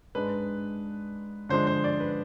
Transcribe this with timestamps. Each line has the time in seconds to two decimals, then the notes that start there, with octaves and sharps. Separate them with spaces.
0.15 G#2 G#3 D4 B4
1.49 D3 F3 G#3 D4 C5
1.67 C5
1.84 D5
2.00 B4